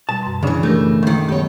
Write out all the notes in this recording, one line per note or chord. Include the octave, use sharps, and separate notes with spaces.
B2 G3 A5
F#2 C6
C#3 E3 C#4 D4 D5
A3 D4 G4 A#4
C#2 D#3 C#6 G6
F#3 B3 G4 A4 C#5